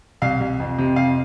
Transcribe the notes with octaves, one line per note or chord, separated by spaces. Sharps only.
C2 F5
C2
F2
C3
F2 F5